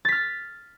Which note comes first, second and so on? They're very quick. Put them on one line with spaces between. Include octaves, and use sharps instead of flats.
A6 B6 F6